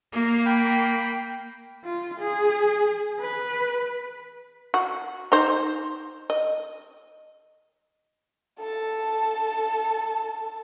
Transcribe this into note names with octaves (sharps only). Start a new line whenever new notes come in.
A#3
G5 B5
F4
G#4
B4
F#4
D#4 C5
D#5
A4 A5